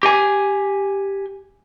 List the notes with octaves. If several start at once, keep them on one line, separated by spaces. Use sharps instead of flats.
G4 G#5